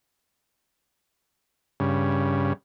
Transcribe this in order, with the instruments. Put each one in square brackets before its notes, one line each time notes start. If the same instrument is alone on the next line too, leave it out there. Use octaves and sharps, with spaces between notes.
[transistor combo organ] G2 C#3